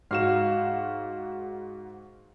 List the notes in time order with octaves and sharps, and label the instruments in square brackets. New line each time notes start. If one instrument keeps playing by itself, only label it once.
[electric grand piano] G#2 F#4 E7 [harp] F5